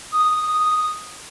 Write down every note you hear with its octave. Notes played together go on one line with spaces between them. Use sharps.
D#6